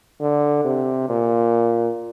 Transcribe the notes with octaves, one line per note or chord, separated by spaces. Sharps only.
D3
C3
A#2